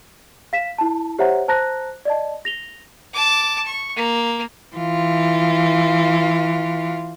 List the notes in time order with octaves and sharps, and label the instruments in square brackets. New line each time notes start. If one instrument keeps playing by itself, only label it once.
[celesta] F5 B6 E7
E4 A5
G4 C5 C#5 E5 F#5 A#5
C5 A5 A#5 F#6 A#6
D5 D#5 A5
A#6 F7 G7
[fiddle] A5 D6
C#6
A#3
[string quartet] E3 F4